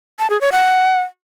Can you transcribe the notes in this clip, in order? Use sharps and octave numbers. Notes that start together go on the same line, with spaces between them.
A5
G#4
C#5
F#5